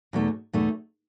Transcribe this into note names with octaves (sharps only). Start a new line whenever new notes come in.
E2 B2 A3 D#4
E2 B2 A3 D#4